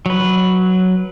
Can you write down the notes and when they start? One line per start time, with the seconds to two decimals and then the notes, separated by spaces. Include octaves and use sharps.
0.06 F#3 B4